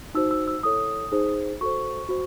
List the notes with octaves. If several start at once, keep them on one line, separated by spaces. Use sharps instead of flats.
D#4 F#4 C5 E6
E6
E6
E4 A4 C#5 D#6
D#4 G#4 C5
F#4 A4 C5 C#6
F#4 C5